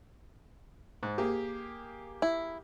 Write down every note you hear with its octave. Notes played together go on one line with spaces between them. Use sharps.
G#2
A#3 G4 G#4
E4